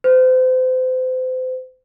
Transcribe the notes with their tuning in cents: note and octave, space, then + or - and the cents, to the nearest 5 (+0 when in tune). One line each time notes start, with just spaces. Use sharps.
C5 -35